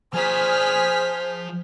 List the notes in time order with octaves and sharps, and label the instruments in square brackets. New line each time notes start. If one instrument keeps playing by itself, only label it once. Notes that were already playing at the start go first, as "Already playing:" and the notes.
[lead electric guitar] F3 A#5 [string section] G#4 F6 B6 [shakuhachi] C5